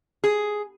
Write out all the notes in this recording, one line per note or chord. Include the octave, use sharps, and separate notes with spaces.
G#4